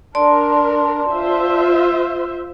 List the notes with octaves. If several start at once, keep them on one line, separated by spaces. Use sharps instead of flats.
D4 A#4 D5 A5 C6
F4 C5 E5